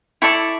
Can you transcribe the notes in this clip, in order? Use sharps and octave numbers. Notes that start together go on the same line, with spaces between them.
E4 A4 D5 C#6